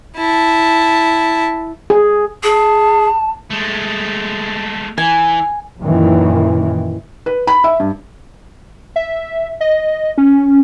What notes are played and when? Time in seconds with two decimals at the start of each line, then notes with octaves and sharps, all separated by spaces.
0.17 E4 A5
1.90 G#4
2.43 G#4 A5
3.51 G#3 A3
4.98 E3 G#5
5.80 F#2 A#2 D#3 E3
7.26 B4
7.47 B5
7.64 E5
7.80 G2
8.96 E5
9.60 D#5
10.18 C#4